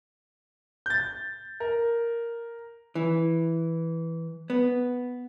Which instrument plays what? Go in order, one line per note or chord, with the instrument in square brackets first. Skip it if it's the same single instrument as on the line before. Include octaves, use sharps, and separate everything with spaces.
[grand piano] G6 A6
A#4
[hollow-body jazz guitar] E3
B3